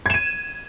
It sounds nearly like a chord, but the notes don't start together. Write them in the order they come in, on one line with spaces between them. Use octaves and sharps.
G#6 E7 D#7